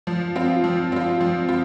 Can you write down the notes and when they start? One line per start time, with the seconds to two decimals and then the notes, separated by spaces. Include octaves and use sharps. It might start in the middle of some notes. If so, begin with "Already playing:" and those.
0.07 F3
0.36 C4 F4
0.64 F3
0.92 C4 F4
1.21 F3
1.49 F4